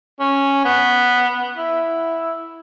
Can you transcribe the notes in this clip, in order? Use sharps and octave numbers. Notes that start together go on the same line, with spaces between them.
C#4
B3
E4